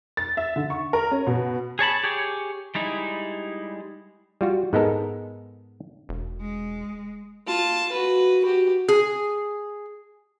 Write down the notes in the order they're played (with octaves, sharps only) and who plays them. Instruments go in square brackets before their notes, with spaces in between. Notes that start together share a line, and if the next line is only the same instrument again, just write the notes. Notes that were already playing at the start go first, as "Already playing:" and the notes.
[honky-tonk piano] A6
E5
D3
C#6
A#4
C#4
B2
[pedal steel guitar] G#4 C#5 A5 B5
G4 G#4 C#5
G3 G#3 D#4 E4
[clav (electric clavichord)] G3 F4 F#4
G#2 G#3 B3 D#4 A4 A#4
[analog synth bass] E1
[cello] G#3
[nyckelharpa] F4 A5
F#4 B4
F#4 G4
[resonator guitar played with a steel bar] G#4